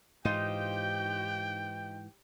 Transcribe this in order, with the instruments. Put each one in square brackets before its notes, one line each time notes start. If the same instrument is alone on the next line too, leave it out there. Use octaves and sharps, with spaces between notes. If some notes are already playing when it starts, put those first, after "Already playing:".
[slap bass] G#2 E3 [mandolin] D#4 F4 C5 [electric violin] G4 G6 [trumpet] G5